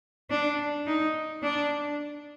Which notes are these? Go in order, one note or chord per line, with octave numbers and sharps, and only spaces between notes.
D4
D#4
D4